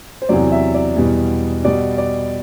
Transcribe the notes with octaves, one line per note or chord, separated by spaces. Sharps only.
C5
E2 C3 F#3 D5
E5
D5
E2 B2 G3
B2 G3 D5
D5